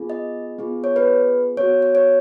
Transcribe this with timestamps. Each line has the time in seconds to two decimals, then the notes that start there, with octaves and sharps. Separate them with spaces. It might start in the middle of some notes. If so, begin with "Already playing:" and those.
Already playing: B3 F4 G#4
0.10 D#5
0.59 B3 F4 G#4
0.84 C#5
0.96 B4
1.57 B3 F#4 C#5
1.82 C#5
1.95 C#5